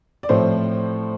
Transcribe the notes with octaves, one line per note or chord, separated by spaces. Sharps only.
D5
A2 F3 A3 C4 C5